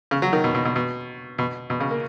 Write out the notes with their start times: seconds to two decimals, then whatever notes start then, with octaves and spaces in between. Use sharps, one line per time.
0.11 C#3
0.22 F#3
0.33 D#3
0.44 B2
0.55 B2
0.65 B2
0.76 B2
1.38 B2
1.70 B2
1.80 C#3
1.91 A#3